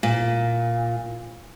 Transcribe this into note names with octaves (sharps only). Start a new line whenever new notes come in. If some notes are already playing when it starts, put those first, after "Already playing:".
A#2